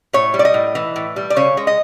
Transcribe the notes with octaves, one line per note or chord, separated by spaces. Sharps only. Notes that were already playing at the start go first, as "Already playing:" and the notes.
A2 C#5
G3
D5
D#5
A2
E3
A2
G3
D5
C#3 C#5
G#3
D#5